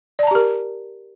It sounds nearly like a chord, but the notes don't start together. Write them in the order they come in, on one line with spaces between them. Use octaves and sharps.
D5 A5 A#5 G4 A#4